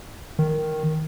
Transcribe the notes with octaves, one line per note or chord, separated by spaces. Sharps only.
D#3